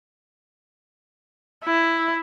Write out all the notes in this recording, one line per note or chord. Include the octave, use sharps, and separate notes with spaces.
E4